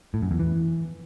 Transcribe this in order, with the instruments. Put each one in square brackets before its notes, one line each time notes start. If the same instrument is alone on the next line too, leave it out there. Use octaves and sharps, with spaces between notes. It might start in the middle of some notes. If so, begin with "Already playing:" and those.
[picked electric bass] A2
F#2
E2
E3